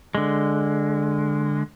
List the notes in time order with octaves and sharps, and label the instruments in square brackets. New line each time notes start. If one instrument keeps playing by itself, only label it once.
[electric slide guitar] D3 G#3